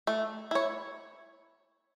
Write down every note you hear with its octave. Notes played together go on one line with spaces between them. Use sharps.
A3
E4 C#5